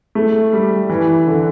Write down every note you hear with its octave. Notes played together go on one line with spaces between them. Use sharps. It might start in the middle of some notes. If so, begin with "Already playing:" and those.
A3
G3
E3
D3